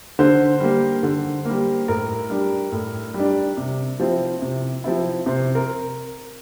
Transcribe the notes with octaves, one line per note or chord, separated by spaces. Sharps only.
D3 C5
G3 A#3
D3
G3 A#3
A2 A#4
G3 D4
A2
G3
D4
C3
F3 C4 E4
C3
F3 C4 E4
C3 C5
A#4